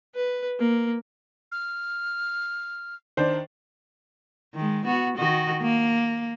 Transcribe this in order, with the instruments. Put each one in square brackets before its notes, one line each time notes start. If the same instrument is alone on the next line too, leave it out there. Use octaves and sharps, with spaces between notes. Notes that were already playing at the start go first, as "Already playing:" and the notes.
[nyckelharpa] B4
A#3
[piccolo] F6
[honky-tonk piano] D#3 D4 [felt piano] C5
[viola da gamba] D#3 G#3
B3 F#4
D#3 F#4 D#5
A#3